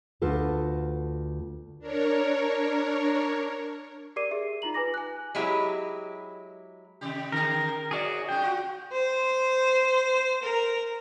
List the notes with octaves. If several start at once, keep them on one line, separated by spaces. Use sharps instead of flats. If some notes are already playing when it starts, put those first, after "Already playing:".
D2 F4 A4 B4
D4 A#4 C#5
G4 A#4 D5 D6 C7 D#7
G4 G#4 E5
D#4 F4 A#5 F#7
B4 G#5 D6 A#6
G#5 F#6
F#3 G#3 E4 G4
C3 D#3 G4
D3 G#4 A#4
D#4 F#4 G#4 C#5 D5
C#3 G#3 F#4 G5
F4 F#4
C5
A#4